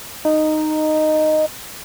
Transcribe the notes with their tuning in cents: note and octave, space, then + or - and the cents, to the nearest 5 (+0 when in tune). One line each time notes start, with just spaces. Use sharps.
D#4 -10